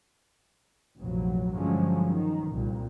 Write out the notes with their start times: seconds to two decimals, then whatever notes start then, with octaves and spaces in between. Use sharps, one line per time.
0.98 F1 A#1 F#3
1.54 G2 D3 F3 F#3 G#3 C#4
2.09 D#3
2.49 C2 A#2